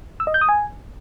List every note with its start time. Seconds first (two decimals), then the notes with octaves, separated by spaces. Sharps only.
0.20 E6
0.27 D#5
0.34 G6
0.41 D#6
0.49 G#5